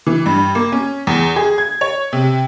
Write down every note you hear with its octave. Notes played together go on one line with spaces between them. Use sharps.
E3
G2
A#3
C#4
E2
G#4
G#6
C#5
C3